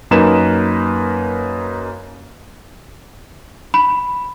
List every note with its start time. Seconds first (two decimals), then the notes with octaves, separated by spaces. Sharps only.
0.11 F#2 A#3 D#4 A#4 B4 E7
3.74 B5